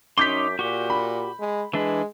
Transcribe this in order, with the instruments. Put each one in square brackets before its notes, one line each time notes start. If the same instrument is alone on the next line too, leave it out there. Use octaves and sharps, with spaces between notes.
[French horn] F#2 [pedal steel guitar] C#4 D#4 C6 [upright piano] D6 G6 B6
[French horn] A#2 [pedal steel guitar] F#4 G4
[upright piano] B5
[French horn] G#3
[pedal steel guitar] E3 D4 B4 [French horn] G#3